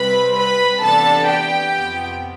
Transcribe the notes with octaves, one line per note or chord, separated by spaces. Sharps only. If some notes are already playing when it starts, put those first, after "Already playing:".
Already playing: C3 G3 C4 B4 B5
B4 B5
C3 E3 B3 D4 A4 A5
G4 G5
F2 C3 F3 B3